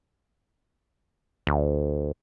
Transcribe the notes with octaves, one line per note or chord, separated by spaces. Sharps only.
D2